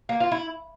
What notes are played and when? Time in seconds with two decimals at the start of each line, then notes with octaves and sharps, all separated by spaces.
0.09 A#3
0.20 F4
0.32 E4